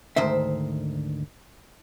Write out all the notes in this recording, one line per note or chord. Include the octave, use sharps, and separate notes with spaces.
D2 G#2 D#3 C5 E5